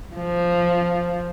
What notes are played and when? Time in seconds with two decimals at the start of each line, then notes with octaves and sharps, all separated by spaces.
0.17 F3